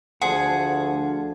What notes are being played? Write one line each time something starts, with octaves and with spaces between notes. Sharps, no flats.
D2 D3 F3 G#4 F#5